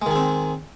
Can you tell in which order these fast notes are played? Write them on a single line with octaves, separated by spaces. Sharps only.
G#3 D#3 G#4 C4